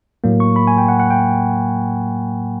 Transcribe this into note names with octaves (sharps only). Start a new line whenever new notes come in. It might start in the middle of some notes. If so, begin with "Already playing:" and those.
A2 F#3 A#3
C#6
B5
G#5
G5
F#5
F#5
G5